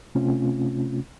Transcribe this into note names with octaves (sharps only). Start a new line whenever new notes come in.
C3 A3 C4 C#4 F4